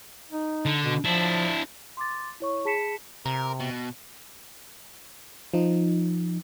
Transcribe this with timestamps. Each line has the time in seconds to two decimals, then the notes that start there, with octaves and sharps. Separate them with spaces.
0.31 D#4
0.66 D3
0.83 B2
1.05 F3 D4 E4
1.97 C6 D6 A6
2.40 E4 C#5 C#6
2.65 G#4 A5 B5 B6 C#7 E7
3.26 C3 A#4
3.60 B2
5.54 F3 D#4